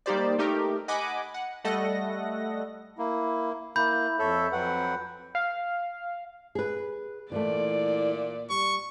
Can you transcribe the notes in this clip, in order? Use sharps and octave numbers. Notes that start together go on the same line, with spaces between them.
G3 A#3 D#4 G4 C5 D5
A3 D#4 G4 A#4
D#5 F#5 G#5 B5 D6
F#5
G3 A3 A4 D#5 F#5 A#6
A#3 E4
A#3 E4 B5 G6
F2 A4 C#5 E5
F2 F#3 B4 F#5 G5
F5
G#4 B4
A#2 E3 A3 D5
G3 C#6